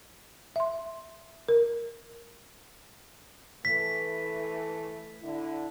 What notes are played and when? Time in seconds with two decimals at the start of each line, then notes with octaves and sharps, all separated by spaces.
0.56 E5 C6
1.49 A#4
3.65 E3 A3 B6
5.22 D3 E4